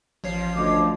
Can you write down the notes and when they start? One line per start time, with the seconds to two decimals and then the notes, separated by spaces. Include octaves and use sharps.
0.24 A1 F3 F4 C#5 C7
0.54 D2 D#5 D6